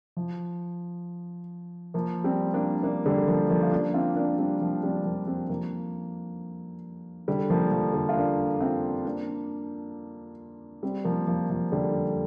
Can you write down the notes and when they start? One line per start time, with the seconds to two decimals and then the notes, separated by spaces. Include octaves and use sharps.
0.17 F3
1.94 F3 A#3
2.24 G3 C4
2.54 A#3 D4
2.83 A#3 D4
3.06 D3 G3
3.28 F3 A#3
3.50 F3 A#3
3.63 F4
3.72 A#3 D4
3.94 C4 F4
4.16 A#3 D4
4.39 G3 C4
4.61 F3 A#3
4.83 G3 C4
5.05 F3 A#3
5.27 G3 C4
5.50 F3 A#3
7.28 D3 G3
7.50 F3 A#3
7.72 F3
7.94 D3
8.09 F4
8.16 A#3 D4
8.60 C4 F4
9.05 A#3 D4
10.83 G3 C4
11.04 F3 A#3
11.27 F3 A#3
11.50 F3
11.72 D3 G3